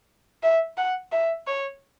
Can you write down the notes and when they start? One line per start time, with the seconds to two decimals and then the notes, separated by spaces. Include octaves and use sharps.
0.43 E5
0.77 F#5
1.12 E5
1.47 C#5